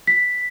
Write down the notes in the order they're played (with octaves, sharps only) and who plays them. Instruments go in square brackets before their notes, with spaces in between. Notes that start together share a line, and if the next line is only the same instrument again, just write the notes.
[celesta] B6